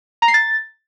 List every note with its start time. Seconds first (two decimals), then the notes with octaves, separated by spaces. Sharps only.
0.22 A#5
0.28 C7
0.34 A6